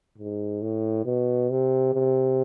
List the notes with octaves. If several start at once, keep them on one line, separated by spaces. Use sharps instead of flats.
G#2
A2
B2
C3
C3